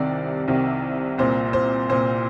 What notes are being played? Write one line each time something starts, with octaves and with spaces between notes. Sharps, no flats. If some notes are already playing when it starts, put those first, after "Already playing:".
Already playing: C2 C3 D#3 D5
C2 C3 D#3
C2 A#2 C5
C5
C2 A#2 C5